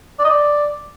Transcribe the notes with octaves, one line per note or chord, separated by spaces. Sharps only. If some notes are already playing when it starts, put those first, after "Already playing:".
D5
D#5
D5